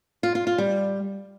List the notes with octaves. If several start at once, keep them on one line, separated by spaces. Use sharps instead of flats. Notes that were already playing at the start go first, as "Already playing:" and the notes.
F4
F4
F4
G3